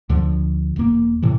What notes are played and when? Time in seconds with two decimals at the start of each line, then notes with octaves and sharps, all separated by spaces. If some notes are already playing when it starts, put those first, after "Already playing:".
0.09 D2 D3 F3
0.76 E1 A#3
1.22 A2 C3 E3